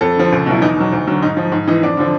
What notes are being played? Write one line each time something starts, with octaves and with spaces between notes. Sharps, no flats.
F2 A4
D3 F3
C#2
B2 F#3 E4
E2 D#4
B2 F#3
D2
D3 F#3
G#2 D#4
F3
G#2
E3 D#4
F2 D4
D3 F3